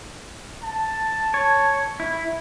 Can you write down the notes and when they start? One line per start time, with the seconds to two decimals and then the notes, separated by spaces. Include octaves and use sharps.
0.63 A5
1.34 C#5
2.00 E4